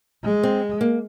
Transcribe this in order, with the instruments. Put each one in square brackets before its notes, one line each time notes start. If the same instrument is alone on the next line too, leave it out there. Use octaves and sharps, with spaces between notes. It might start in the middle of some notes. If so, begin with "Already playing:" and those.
[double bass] G#3
[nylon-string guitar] C4
A#3